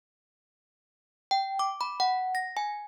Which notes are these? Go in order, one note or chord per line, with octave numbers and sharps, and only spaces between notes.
G5
D6
B5
F#5
A#6
G#5